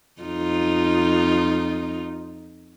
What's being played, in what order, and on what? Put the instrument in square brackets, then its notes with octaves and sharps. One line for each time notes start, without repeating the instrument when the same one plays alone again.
[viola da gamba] F2 D#4 F4